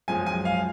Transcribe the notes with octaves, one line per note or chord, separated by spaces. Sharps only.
F#2 F3 G#3 G#5
G#5
F5